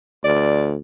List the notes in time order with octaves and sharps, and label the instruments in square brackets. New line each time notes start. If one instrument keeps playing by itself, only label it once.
[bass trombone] D2 [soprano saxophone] D5